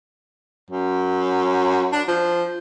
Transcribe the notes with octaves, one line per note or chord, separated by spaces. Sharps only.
F#2
D4
F3